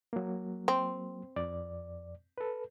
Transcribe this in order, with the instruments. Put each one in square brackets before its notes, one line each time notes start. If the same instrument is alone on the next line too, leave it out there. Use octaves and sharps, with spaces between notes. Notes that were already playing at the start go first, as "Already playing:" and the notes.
[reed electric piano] F#3 A#3
[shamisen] C4
[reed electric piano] F2 D5
A4 B4